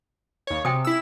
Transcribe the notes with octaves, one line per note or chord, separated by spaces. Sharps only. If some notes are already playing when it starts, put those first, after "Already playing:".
D#2 C#5
C3 G5 G#5 D#6
E4 E6